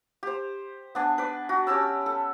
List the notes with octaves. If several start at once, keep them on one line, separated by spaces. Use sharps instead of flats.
G4 C5
B3 D4 G#5
B4 D5
F#4
C#4 G4 A5 E6
A4